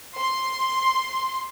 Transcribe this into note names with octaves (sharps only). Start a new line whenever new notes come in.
C6